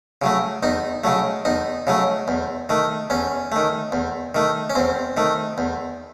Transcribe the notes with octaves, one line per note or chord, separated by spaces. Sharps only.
C#3 F#3 A3
E2 D#4
C#3 F#3 A3
E2 D#4
C#3 F#3 A3
E2
D#3 A3
E2 C#4
D#3 A3
E2
D#3 A3
C#4
E2 C4
D#3 A3
E2